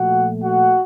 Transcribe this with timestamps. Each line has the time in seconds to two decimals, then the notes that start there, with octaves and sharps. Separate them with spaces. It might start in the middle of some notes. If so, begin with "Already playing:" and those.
Already playing: A#2 F3 A3 F#4 F#5
0.44 F#4 F#5